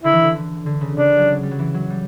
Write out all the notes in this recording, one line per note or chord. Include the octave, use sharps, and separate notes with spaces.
D3 E4
E3
D3
D3
C#3
C#3 D4
F#3
G3
F#3
E3
F#3
G3